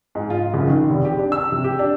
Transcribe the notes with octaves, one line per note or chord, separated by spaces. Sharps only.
G#2
F4
F#1
D#3
F1
G4
D4
E6
C3
G4
D4